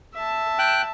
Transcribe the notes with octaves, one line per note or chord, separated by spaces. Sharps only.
E5 A5
G5 F#6